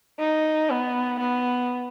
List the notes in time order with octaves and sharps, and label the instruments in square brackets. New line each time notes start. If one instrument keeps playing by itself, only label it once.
[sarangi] D#4
B3
B3